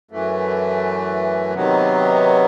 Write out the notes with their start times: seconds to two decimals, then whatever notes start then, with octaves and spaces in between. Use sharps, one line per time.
0.11 F#2 E3 A3
1.54 C3 D#3 F#3 B3